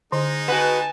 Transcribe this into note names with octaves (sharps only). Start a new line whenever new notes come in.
D3 G#3 D#4
F#4 B4 F#5 G#5 A5